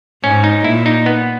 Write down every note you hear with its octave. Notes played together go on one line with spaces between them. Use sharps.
G#2 C#4
D#4
A#2 E4
D#4
B3